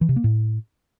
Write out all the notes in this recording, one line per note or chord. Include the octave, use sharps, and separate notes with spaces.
E3
C3
A#3
A2